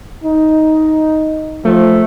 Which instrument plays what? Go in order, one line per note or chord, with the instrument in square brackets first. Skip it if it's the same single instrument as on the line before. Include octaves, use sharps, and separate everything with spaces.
[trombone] D#4
[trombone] F3 [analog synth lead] A3